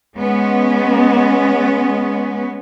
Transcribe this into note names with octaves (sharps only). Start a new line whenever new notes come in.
G#3 B3 C#4